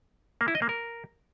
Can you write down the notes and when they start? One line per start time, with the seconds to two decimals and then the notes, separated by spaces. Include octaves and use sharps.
0.41 A#3
0.48 E4
0.55 D#5
0.62 A#3
0.69 A#4